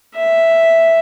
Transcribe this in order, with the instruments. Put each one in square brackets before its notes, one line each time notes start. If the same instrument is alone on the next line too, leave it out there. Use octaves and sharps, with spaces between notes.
[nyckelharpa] E5